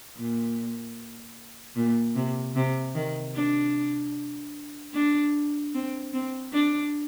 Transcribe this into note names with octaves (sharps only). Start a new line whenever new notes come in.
A#2
A#2
C3
C3
D#3
D4
D4
C4
C4
D4